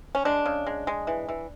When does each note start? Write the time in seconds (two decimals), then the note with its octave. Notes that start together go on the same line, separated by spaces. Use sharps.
0.15 C#4
0.25 G#3 D4
0.46 C#3
0.67 G#3
0.87 G#3
1.07 E3
1.29 E3